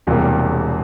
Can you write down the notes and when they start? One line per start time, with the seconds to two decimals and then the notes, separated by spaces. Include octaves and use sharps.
0.07 E1 E2 C3 G3 A#3